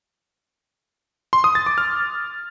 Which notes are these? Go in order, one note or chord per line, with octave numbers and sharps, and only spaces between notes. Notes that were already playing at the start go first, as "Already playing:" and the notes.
C6
D#6
A6
D6
F6